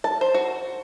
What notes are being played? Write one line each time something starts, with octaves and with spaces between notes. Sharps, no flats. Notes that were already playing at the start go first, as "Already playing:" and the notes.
A5
C5
F#4